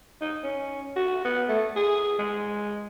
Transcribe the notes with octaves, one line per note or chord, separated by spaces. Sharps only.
D#4
C#4
F#4
B3
A3
G#4
G#3